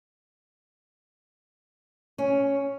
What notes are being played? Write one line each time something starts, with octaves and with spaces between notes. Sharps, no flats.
C#4